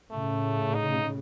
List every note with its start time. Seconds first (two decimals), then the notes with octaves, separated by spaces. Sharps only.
0.11 A2 C#3 A3
0.74 D#4